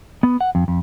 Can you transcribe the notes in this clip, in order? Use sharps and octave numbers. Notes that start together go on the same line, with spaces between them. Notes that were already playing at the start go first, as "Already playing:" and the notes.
B3
F#5
F2
F2